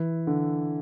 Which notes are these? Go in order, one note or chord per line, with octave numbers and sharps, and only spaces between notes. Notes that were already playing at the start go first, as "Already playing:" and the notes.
Already playing: E3
D3